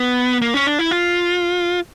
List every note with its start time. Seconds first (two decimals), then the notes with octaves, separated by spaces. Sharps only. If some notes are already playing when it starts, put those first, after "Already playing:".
Already playing: B3
0.42 A#3
0.54 C#4
0.67 D4
0.79 E4
0.91 F4